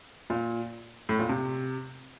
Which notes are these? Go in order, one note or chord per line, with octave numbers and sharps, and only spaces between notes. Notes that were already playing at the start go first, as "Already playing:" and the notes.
A#2
A2
A#2
C3